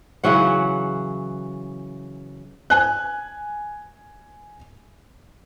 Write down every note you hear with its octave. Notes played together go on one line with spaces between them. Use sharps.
C#3 E3 F#3 F#5
G#5 F#6